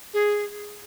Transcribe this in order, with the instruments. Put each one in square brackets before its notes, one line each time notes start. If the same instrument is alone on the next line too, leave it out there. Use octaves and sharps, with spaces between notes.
[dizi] G#4